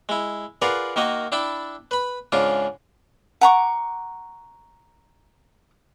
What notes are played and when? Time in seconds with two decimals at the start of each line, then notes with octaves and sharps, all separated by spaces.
0.09 G#3 E4
0.62 F4 G#4 A#4 B4 D5 F#5
0.96 D#3 A#3 F#4 D#5
1.32 D4 E4 G5 A5 B5
1.91 B4 B5
2.32 G#2 C#3 D4 F4
3.41 F#5 A#5 C#6 D6